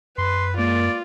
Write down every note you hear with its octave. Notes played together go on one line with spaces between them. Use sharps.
F#2 B4 C6
G#3 A#3 F4 A#4 D5